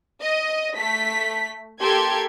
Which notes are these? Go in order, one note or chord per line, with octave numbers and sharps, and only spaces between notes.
D#5
A3 B6
A#3 G4 A4 C6 G#6